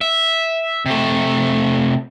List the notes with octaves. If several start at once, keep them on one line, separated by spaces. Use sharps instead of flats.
E5
C3 A3